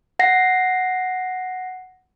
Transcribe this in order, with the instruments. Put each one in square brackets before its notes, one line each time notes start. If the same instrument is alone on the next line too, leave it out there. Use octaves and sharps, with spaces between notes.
[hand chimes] F#5 A#6 C7